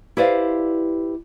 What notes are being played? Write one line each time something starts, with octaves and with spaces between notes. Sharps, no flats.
E4 G4 B4 C5 D5 F5